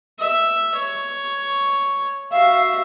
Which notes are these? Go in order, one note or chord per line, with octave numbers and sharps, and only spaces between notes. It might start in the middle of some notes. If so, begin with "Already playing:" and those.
E5
C#5
F#4 E5 F5